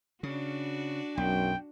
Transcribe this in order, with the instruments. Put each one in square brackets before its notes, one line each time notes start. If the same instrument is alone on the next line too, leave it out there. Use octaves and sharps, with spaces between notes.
[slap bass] C#3 [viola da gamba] D4 F#4
[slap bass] B1 [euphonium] F#2 [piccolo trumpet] G5